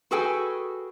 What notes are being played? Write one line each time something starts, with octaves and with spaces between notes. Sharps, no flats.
F#4 G#4 A4 B4 G5 G#5